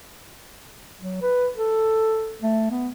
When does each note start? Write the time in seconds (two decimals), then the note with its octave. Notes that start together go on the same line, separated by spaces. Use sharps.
1.01 F#3
1.22 B4
1.56 A4
2.42 A3
2.71 B3